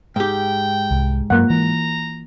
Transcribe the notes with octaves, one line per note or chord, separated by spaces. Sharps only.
G#2 G4 G5
C2
G2 F#3 A#3 F#5
E3 A#5